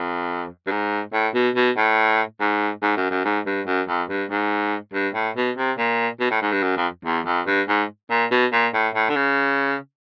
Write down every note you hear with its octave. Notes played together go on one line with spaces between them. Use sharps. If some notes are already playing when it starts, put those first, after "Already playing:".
Already playing: F2
G2
G#2
A2
B2
B2
A2
G#2
G#2
F#2
F#2
G#2
G2
F#2
F2
G2
G#2
G2
A2
B2
C3
A#2
B2
A2
G#2
G2
F#2
F2
E2
F2
G2
G#2
A#2
B2
A#2
A2
A2
D3
C#3